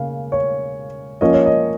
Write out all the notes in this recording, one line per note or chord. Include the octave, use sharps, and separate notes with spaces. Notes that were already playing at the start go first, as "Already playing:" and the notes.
Already playing: C#3 A#3 F5
C#5
F3 A#3 C#4 D#5
C#5
D#5